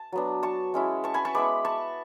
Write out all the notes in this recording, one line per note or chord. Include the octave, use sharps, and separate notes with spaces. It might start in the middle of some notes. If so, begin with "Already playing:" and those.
Already playing: A5
F#3 B3 D4
A5 C#6
G#3 C#4 E4
A5 C#6
G#5 B5
A5 C#6
G#3 B3 E4 B5 D6
A5 C#6